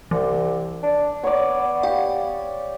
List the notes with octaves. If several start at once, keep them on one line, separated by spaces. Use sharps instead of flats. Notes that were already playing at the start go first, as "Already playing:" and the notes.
C2 E3
D4
B3 C#5 D5
G4 F5